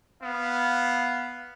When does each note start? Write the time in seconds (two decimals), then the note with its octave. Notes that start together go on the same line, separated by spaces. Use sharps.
0.20 B3 F5